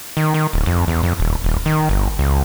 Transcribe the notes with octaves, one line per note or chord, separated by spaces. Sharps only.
D#3
D#3
D1
F2
E2
F2
D#1
D#1
D#3
G1
C#2